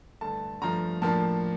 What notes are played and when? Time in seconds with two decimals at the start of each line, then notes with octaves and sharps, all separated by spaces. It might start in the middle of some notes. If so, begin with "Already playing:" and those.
0.21 G2 D3 A3 A5
0.62 G2 F3 A3 A#5
1.02 A2 F3 A#3 D4 A5